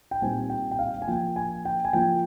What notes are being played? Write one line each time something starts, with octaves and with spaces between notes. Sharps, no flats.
G5
A#2 G3 C4 D#4 G#5
G5
G5
F5
G#5
F3 A#3 F4 G5
G#5
G5
G#5
F3 A#3 F4 G5